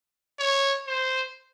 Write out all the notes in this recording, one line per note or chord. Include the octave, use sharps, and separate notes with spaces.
C#5
C5